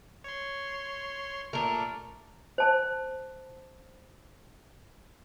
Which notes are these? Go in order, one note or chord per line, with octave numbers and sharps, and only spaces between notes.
C#5 C6
A#2 A3 D4 A#4
C5 A5